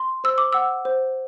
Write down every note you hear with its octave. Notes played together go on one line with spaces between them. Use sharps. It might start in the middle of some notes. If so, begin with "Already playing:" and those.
Already playing: C6
C5 E6
D6
F#5 E6
C5